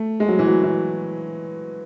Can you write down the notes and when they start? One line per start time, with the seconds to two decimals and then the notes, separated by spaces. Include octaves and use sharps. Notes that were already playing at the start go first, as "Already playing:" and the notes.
Already playing: A3
0.20 G#3
0.28 F#3
0.39 E3
0.48 F#3
0.63 E3